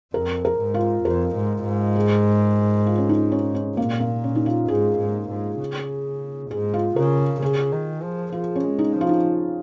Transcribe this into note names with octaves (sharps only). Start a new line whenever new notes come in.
F2 A#4
A#4
G#2
F4
F2 A#4
G#2
G#2
G#4
F4
C#4
D#4
C#4
C#4
A#2 A#3
A#3
C#4
D#4
F4
G#2 G#4
G#2
G#2
C#3
G#2 G#4
F4
C#3 A#4
C#3 G#4
D#3
F3
F3 F4
C#4
G#3
D#4
F3
F4
D#4